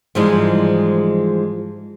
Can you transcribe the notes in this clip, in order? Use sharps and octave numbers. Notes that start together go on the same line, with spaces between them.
G#2 E3 F3 G3 G#3